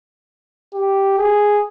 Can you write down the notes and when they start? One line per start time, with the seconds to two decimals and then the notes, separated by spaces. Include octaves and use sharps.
0.74 G4
1.18 G#4